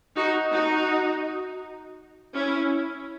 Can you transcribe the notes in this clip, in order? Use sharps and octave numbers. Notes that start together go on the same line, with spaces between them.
D#4 F#4
D#4 F#4
C#4 E4